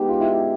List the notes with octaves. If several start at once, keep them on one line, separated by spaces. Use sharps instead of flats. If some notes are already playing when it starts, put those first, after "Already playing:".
Already playing: G#3 B3 D#4 G4
F4
E4
F4